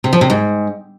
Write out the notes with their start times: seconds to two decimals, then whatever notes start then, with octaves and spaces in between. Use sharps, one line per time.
0.04 C3
0.13 F3
0.21 C3
0.30 G#2